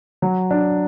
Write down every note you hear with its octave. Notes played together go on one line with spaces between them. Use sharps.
F#3
D4